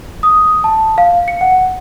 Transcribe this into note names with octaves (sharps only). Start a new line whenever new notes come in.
D#6
A5
F5
C#7
F#5